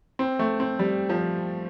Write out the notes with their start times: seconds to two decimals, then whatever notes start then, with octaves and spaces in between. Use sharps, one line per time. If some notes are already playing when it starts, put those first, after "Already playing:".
0.19 C4
0.39 A3
0.60 C4
0.79 G3
1.09 F3